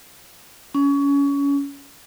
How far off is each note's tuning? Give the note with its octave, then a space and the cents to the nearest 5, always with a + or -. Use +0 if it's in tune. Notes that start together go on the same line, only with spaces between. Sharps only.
C#4 +25